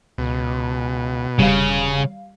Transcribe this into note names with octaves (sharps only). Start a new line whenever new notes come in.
C#2 B2
E1 C#3 G3 F5